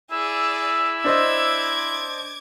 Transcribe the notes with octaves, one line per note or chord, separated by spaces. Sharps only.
E4 G#4 D5 E6
D4 C5 D#5 D6 G#6